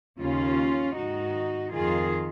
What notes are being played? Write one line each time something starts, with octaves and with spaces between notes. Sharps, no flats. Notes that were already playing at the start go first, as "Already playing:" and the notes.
D#2 C#3 C#4 F4
G#2 D#3 D#4 F#4
F2 D#3 F4 G#4